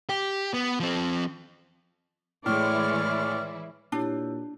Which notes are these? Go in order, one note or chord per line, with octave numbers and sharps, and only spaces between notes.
G4
B3
F3 C4
A2 E3 G#3 E4 C#5 D5 F6
A#2 D4 E4 G4 C#5